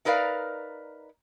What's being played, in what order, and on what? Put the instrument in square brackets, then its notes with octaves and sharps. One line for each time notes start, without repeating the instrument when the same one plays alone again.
[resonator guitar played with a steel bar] D#4 A#4 B4 D5 F5